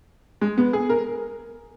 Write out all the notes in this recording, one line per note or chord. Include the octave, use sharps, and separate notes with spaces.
G#3
B3
G#4
A#4